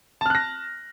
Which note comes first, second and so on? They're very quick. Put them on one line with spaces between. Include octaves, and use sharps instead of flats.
A5 F6 F#6 A#6